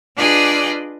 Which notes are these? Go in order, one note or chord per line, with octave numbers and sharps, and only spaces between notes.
D4 F4 G#4 B4 D5 D#5